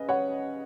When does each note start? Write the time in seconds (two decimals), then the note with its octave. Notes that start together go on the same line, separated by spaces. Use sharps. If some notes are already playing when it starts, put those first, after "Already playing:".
Already playing: C#3 B4 D#5
0.09 C#5 F#5